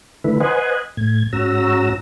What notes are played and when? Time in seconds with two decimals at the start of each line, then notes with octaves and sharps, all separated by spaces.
0.24 D3 D#3 A3 E4 B4
0.40 B4 C5 D#5 F#5 G#5
0.97 A2 G#6
1.33 G#2 C#4 F#4 A#5 E6